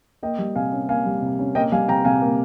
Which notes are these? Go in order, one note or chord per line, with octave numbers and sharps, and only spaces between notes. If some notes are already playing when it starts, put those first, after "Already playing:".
A#3 D#5 G5
G3
C3 F5 G#5
C#4
A#3 F5 G#5
G3
C3
C#4
A#3 D#5 G5
G3 F5 G#5
C3 G5 A#5
C3 F5 G#5
A#3